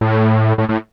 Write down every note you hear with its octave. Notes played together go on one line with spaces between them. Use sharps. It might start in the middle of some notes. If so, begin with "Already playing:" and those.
A2
A2
A2